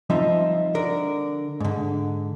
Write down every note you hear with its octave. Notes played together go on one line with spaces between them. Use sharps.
F3 G3 C4 D#4 F4 E5
D3 A#4 D5
G#2 D3